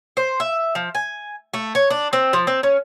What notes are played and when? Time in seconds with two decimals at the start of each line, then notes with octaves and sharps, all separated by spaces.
0.17 C5
0.40 E5
0.75 F3
0.95 G#5
1.54 A3
1.75 C#5
1.90 D4
2.13 C4
2.33 F3
2.47 C4
2.63 C#4